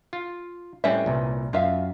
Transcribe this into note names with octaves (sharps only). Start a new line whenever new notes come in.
F4
A2 G3 C4 C#4 B4 E5
C2 A#2
F#2 F4 E5 F5